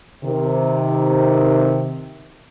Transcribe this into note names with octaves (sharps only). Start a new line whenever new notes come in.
C3 D#3